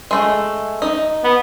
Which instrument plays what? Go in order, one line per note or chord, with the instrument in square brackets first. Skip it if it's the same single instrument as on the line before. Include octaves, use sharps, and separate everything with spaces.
[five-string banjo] G#3 A3
D#4
[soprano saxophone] B3